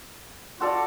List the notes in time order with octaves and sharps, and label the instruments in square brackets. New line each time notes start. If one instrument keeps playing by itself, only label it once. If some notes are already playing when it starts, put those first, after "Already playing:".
[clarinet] F4 [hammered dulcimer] F#4 A4 D5